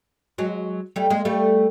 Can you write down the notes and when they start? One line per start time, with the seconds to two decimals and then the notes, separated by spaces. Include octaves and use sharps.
0.38 F#3 G#3
0.96 G3 A3
1.10 G#3 A#3
1.25 G3 A3